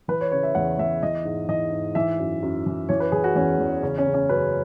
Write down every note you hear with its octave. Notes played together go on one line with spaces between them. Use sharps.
E3 B4
C#5
C#3 C#5
E5
E2 F#5
E2 E5
E3 D#5
G#2
E3 D#5
G#2
E3 E5
F#2
F#2
E3
E3 C#5
B4
E3 G#4
F#4
E2 C#4
E2
C#3 C#4
C#4
C#3
C#4
F#2 B4